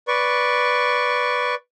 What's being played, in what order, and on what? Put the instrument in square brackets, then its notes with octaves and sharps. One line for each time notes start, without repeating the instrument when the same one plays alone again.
[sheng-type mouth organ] B4 D5 C#6